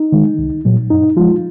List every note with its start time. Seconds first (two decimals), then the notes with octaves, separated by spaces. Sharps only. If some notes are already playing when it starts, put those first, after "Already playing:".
Already playing: D#4
0.12 D#3 G#3
0.39 C2
0.65 A#2 F#3
0.90 F#2 D#4
1.17 F3 G#3 F4